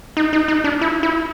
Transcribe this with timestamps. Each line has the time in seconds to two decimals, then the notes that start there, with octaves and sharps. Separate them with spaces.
0.17 D#4
0.33 D#4
0.48 D#4
0.64 D4
0.81 E4
1.03 E4